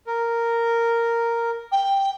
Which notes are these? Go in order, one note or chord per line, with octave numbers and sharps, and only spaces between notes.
A#4
G5